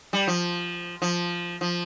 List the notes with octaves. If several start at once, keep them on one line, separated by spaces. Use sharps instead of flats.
G3
F3
F3
F3